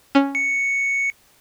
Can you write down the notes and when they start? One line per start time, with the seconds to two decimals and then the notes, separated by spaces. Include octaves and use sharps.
0.15 C#4
0.35 C#7